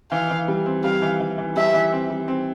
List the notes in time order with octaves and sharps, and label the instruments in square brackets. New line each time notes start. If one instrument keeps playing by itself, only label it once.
[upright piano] E3 [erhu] F5
[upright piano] E3
G3
C4
[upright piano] G3 [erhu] F5
[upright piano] E3
E3
E3
[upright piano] G3 [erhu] E5
[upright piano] E3
C4
G3
C4